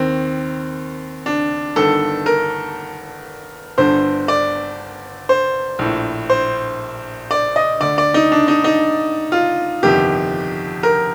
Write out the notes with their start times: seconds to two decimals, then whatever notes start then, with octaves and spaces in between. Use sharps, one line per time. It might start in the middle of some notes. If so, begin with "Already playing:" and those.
Already playing: D#2 D#3 C4
1.26 D4
1.76 G1 G2 D#3 A4
2.26 A#4
3.78 G1 G2 D3 C5
4.28 D5
5.29 C5
5.79 A#1 A2
6.30 C5
7.31 D5
7.56 D#5
7.81 D2 D3 D5
7.98 D5
8.14 D#4
8.32 D4
8.48 D#4
8.64 D#4
9.32 F4
9.83 G1 F2 C3 D#3 G4
10.83 A#4